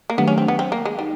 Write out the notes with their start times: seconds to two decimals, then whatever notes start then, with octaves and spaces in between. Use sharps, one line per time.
0.10 A#3
0.18 D#3 F#3 A3 B3 D4 G4
0.28 C#4
0.38 C4
0.48 B3
0.59 C4
0.72 A#3
0.85 G#3
0.99 G3 D#4